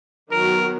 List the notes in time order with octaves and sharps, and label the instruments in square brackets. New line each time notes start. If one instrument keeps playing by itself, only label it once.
[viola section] D#3 F#3 B3 F#4 [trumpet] A#4